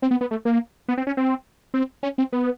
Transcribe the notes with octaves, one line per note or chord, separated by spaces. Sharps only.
C4
B3
B3
A3
A#3
B3
C4
C#4
C4
C4
C#4
C4
B3